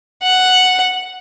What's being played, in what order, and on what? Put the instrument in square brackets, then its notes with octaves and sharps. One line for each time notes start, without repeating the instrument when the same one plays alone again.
[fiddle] F#5